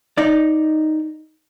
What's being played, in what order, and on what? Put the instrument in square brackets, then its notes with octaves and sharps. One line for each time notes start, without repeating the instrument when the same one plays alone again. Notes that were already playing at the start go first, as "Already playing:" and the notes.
[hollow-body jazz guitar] D#4 D5